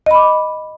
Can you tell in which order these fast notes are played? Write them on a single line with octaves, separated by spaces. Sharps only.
D#5 B5 D6